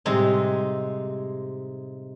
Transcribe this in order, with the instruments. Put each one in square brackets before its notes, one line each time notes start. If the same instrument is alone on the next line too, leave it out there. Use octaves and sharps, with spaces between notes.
[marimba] A2 G3 G4 [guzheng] C3 G#3 D#4